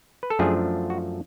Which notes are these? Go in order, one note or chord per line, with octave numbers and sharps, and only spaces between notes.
B4
A4
F#2 F3 A3 D4 F4 G#4
F#4